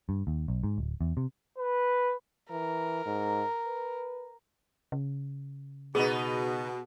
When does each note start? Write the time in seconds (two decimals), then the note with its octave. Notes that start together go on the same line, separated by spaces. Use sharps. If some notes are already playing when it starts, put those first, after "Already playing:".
0.09 G2
0.27 D#2
0.48 B1
0.64 G#2
0.78 D1
1.01 E2
1.17 C3
1.58 B4
2.50 E3 A#4
3.05 G#2
3.66 B4
4.92 C#3
5.95 B2 B3 D#4 G#4